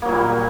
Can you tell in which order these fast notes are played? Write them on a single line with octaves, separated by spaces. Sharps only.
A#3 F#3 A#2 G3